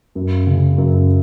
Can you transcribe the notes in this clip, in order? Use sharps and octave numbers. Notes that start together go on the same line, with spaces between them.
F#2
C#3
F#2